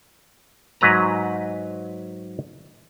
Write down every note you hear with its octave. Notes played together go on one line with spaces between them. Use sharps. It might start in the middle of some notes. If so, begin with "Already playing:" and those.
G#2 F#3 B4 A#5